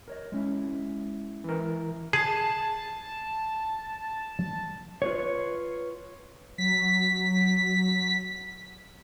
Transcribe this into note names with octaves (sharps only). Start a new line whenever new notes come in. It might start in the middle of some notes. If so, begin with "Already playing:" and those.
A#4 C#5 D#5
G#3 C#4 E4
E3 A#4
G#4 A5
F4 B4 C#5
F#3 B6